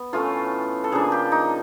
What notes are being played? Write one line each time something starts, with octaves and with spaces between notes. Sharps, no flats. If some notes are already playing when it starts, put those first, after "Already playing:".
Already playing: B3
A2 E3 A3 C#4 F4
A4
C#3 F3 A#3 D4 G#4
G4
D#4